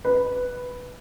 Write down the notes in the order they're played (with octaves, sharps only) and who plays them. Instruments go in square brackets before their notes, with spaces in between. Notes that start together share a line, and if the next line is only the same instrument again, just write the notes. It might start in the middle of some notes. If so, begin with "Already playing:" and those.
[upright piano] B4